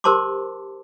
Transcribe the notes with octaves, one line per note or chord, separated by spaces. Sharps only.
G4 A#4 C5 A5 C6 D6